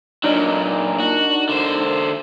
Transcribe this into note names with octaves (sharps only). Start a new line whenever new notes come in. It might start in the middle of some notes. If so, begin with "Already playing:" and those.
A#2 F#3 D4 D#4 A#4
F#4
D3 C5